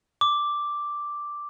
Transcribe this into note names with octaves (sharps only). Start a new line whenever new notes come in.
D6